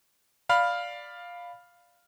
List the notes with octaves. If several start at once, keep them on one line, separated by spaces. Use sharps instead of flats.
D5 F5 B5 F6